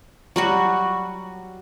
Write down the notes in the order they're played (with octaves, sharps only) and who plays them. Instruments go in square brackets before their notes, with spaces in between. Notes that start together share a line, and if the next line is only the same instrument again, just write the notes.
[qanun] F#3 G3 F#4